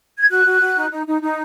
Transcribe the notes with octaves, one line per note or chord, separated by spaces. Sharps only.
G#6
F#4 F#6
F#4
F#4
D#4
D#4
D#4
D#4